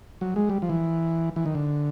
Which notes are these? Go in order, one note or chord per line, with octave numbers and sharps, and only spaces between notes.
F#3
G#3
G3
F3
E3
E3
D#3
D3